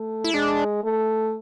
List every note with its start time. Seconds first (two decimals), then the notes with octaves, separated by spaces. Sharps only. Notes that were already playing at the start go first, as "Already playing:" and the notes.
Already playing: A3
0.24 E4
0.33 G#3 D4
0.84 A3